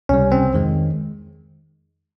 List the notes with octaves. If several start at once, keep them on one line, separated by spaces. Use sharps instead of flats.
C#2 C3 G3 C#4
C4
F2 D#3 G#3